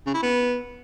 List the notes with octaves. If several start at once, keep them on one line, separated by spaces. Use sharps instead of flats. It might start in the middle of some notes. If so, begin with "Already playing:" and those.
C#3
E4
B3